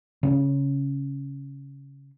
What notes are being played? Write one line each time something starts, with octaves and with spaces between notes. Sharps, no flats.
C#3 C4 C#4